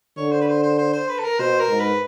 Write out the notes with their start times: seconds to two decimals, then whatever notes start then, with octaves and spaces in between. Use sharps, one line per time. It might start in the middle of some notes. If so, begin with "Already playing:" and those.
0.17 D3 C#5
0.32 C5
0.41 B4
0.48 C5
0.63 C5
0.78 C5
0.93 C5
1.09 B4
1.19 A4
1.24 A#4
1.39 B2 C5
1.59 A#4
1.69 G#2
1.80 B4